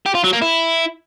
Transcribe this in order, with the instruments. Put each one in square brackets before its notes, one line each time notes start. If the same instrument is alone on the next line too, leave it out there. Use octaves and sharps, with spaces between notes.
[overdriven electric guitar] G4
F4
F#3
A#3
E4